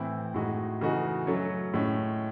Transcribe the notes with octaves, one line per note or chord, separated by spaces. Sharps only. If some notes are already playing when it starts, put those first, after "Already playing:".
Already playing: A2 E3 C4 E4
A2 G#3 D#4 F#4
C#3 E3 A3 D#4 F#4
F#3 A3 C#4
A2 G#3 C#4